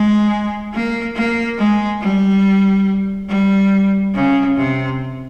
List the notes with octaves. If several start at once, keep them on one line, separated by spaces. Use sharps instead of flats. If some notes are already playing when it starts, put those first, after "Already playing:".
Already playing: G#3
A#3
A#3
G#3
G3
G3
C#3
C3